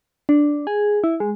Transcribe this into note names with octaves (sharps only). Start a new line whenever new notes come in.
D4
G#4
E4
G#3